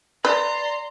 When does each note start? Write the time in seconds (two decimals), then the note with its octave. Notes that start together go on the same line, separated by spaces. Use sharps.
0.25 B4 D5 A#5 C6